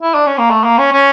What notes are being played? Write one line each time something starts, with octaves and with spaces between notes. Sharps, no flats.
E4
D4
C#4
A#3
A3
A#3
C#4
C#4